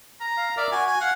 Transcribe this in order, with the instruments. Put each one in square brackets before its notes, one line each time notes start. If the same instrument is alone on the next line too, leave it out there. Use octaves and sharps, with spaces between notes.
[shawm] A#5
[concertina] F5
[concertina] A#4 E5 F6 [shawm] D5
[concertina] F#4 [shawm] G#5
[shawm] G#5
[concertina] F5 [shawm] F#5